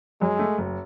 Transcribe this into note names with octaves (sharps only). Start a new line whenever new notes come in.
F#2 G#3
A3
F#1